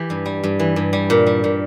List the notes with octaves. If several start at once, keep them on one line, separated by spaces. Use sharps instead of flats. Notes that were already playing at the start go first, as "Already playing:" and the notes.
Already playing: E3 G4
G2
G3
G2
E3
G2
G3
A#2
G3
A#2